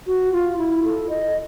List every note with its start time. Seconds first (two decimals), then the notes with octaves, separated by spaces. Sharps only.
0.07 F#4
0.32 F4
0.58 E4
0.84 A4
1.09 D#5